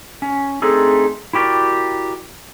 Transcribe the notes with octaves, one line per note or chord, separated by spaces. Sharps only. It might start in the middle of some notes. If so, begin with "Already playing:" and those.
C#4
A3 C4 D4 D#4 G#4 A4
E4 F#4 G4 A#4 D5